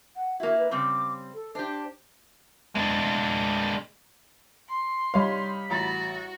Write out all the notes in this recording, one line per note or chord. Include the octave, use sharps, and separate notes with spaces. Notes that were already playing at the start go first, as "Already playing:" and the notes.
F#5
A#3 E4 F#4
B4
C#3 G3 C4 D6
A4
D4 G4 C5
G#3 D4
C6
G3 D#4 G4 C#5 F5 B5
A1 F#4 A#5 A6